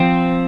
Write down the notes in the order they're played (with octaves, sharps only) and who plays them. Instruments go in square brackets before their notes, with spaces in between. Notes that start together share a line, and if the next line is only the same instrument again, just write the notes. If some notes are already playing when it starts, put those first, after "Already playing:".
Already playing: [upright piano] F3 [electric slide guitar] C4